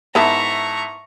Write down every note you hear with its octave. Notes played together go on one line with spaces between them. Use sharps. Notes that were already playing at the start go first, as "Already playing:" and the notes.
G#2 B3 E4 A#4 E5 A5 A#5 C#6